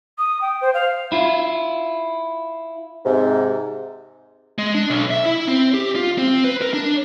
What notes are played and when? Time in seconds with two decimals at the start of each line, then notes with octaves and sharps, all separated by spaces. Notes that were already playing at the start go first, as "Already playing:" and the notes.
0.18 D#6
0.41 G5
0.61 C5
0.74 F5
1.12 E4 F4
3.05 G#2 C3
4.58 G#3
4.74 D4
4.90 B1
5.11 E5
5.25 E4
5.47 C4
5.74 G4
5.96 F4
6.18 C4
6.44 B4
6.62 A#4
6.73 D4